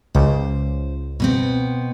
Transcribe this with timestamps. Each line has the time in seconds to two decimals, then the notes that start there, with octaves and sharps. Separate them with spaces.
0.15 C#2 C5
1.20 B2 B3 C4